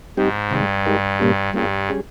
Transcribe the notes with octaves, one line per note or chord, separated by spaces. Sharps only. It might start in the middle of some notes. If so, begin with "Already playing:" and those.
G#2 G3 C4 D#4 G4
G2 C3 D#3 G#3
G#3 D#4 G4 A#4
A#2 G3 A#3 C#4 G4
G2 G3 A#3 C#4 F4 G#4
G3 C#4 G#4